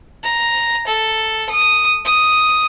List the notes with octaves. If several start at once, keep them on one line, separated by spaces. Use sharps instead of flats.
A#5
A4
D#6
D#6